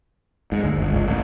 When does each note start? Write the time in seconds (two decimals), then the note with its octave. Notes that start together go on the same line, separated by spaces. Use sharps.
0.52 G#2
0.64 D2
0.78 G1
0.93 C#2
1.07 A1